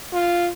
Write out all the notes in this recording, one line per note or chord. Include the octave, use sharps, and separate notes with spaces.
F4